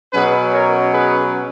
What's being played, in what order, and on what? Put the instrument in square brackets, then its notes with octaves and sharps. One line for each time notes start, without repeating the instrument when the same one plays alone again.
[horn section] B2 F#3 C#4 G#4 B4
A#4 C#5
G#4 B4